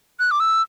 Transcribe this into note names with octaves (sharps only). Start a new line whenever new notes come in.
F#6
D6
E6